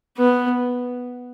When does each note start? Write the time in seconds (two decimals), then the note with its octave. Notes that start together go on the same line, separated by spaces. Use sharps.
0.18 B3